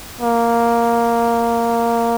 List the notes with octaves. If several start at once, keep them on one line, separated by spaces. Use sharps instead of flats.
A#3